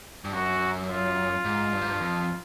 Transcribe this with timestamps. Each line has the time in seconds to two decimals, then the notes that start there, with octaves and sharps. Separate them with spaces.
0.25 G2
0.33 F#2 F#4
0.88 F4
1.45 G#2
1.73 G2
1.81 G#2
1.90 G2
2.01 F2